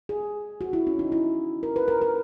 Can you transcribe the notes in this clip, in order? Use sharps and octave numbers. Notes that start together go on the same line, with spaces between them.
G#4
F#4
E4
C#4
D#4
E4
A#4
B4
A#4
A#4